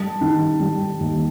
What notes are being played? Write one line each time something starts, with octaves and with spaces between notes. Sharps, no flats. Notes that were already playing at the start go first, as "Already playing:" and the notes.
Already playing: G3 A5
D#3
G3
D#2